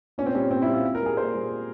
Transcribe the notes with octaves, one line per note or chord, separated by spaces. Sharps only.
A#2 C#4
C4
G3 C#4
A#2 C4
E4
G3
F4
A#2
A#4
G3 G#4
A#2 C5
G3